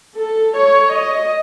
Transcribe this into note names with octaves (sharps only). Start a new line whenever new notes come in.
A4
C#5
D#5